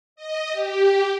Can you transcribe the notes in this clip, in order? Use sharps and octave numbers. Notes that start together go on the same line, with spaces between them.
D#5
G4